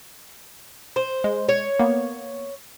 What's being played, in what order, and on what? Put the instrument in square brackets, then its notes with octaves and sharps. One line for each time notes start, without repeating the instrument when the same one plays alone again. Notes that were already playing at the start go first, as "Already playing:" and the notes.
[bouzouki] C5
[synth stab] G#3
[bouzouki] C#5
[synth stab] A#3 B3